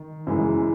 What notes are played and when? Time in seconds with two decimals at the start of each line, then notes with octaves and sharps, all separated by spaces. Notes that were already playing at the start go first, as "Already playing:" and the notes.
Already playing: D#3
0.27 F#2 C#3 E3 G#3